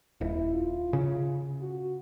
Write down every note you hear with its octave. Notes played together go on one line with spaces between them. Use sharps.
D#1 E4
F4
C#3
F#4